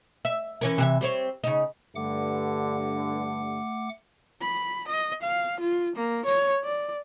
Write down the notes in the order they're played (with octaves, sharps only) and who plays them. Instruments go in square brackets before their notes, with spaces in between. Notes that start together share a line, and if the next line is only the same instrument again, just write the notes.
[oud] E5
E3 C#4 A#4
C3 E3 E5
G3 C4 C#5
C#3 D#4
[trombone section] G2 D3 [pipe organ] A3 F#5 D6
[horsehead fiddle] B5
D#5
F5
F4
A#3
C#5
D5